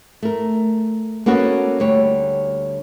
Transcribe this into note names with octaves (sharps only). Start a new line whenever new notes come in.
A3 A#4
A#3 B3 C#4 F#4 A4 C#5
D2 G3 C#5